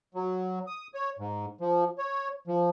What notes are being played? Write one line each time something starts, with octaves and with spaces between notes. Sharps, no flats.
F#3
D#6
C#5
G#2
F3
C#5
F3